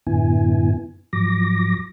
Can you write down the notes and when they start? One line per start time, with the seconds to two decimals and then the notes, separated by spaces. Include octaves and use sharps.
0.07 F#2 A2 D3 B3 E4 G#5
1.13 G#2 F3 F#3 D6 A#6